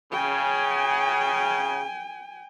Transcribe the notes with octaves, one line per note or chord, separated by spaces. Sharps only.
C#3 G5 G#5